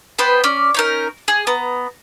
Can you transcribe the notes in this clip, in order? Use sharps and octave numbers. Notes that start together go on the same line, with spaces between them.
B3 B4 C5 G5
C#4 D5
C#4 D#4 A#4
G#4
B3 A#5